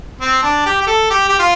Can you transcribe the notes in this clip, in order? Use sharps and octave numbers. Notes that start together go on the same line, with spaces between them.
C4
D4
G4
G4
A4
G4
G4
F4